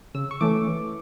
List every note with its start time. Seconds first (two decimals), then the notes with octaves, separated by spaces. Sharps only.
0.14 C#3 E6
0.31 C#6
0.41 E3 A3 C#4 D6
0.68 E3